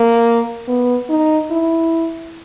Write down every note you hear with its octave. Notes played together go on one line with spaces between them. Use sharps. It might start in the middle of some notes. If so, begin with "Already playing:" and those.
Already playing: A#3
B3
D#4
E4